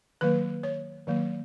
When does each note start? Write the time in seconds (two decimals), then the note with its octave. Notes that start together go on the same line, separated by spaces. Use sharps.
0.21 D#3 F#3 A#3 B4
0.63 C#5
1.07 D#3 F#3 A#3